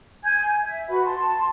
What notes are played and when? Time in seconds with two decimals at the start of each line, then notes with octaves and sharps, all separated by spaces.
0.25 G#5 G6 G#6
0.63 E5
0.89 F#4 B4 B5
1.05 A5 C6